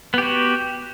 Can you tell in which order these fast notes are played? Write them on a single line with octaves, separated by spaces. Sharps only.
B3 G4 F#4